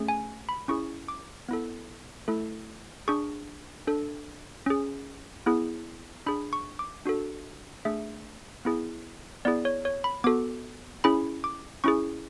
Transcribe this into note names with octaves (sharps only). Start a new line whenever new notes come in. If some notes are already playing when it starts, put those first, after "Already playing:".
Already playing: A3 C#4 G#4
G#5
B5
C#4 E4 G#4 C#6
D6
B3 E4 A4
A3 E4 A4
D4 G#4 C#6
D4 A4
C#4 G#4
B3 E4 G#4
D4 G#4 B5
C#6
D6
D4 F#4 A4
A3 D4 G#4 E5
B3 E4 G#4
B3 E4 G#4 D5
C#5
C#5
B5
B3 F#4 A4 D6
C#4 E4 G#4 B5
D6
C#4 E4 G#4 C#6